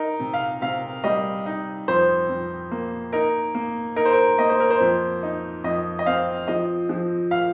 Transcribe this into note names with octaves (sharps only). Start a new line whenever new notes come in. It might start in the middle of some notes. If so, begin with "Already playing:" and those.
Already playing: D#4 A#4
C3
F5
C3 F5
G3 D#5
D#4
F2 C5
F2
A#3
D#4 A#4
A#3
D#4 A#4
C5
A#4
A#3 D#5
C5
A#4
C5
F2
D#4
F2 D#5
D#5
C4 F5
F3 D#5
F3
F5